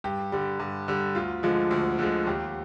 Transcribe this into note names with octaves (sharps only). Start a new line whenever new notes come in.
G2 G4
D3 G3
G2
D3 G3
D2 F4
D3 F3 G#3
D2
D3 F3 G#3
D#2 G4